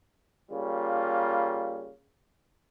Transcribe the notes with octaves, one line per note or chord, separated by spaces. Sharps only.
C#3 G3 A#3 F4